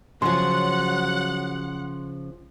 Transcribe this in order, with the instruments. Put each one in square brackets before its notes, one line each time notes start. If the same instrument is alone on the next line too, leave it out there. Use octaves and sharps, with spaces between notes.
[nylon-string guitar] C#3 F3 [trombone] F#3 [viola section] F#5 [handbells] C6